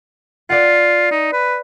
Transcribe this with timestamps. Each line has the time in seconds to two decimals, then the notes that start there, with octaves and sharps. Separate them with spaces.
0.50 F4 D5 F#5
1.11 D#4
1.33 B4